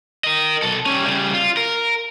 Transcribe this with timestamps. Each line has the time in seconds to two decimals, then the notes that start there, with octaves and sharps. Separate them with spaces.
0.24 A#4 D#5
0.62 B1 A4
0.86 G3 C#4
1.06 C#3 G3
1.34 F4
1.57 A#4